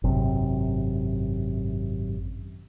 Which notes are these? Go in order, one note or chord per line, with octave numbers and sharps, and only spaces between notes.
G#1 F#2 C3